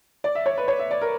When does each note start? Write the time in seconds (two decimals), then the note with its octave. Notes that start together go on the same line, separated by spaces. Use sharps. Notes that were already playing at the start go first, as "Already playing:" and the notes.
0.24 D5
0.35 E5
0.46 C#5
0.58 B4
0.68 C#5
0.79 E5
0.91 D5
1.01 A#4